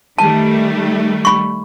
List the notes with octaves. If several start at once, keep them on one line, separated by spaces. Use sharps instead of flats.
D#3 G3 A3 A5
B5 C#6